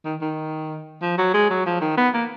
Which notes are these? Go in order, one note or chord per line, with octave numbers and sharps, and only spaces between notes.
D#3
D#3
F3
F#3
G#3
F#3
F3
D#3
B3
A#3